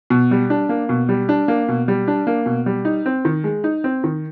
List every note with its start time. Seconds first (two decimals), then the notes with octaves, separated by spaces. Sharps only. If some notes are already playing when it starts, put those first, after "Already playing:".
0.10 B2
0.31 G3
0.50 D4
0.69 A#3
0.89 B2
1.09 G3
1.29 D4
1.48 A#3
1.68 B2
1.88 G3
2.08 D4
2.27 A#3
2.46 B2
2.66 G3
2.85 D#4
3.06 C4
3.25 D#3
3.44 G#3
3.64 D#4
3.84 C4
4.04 D#3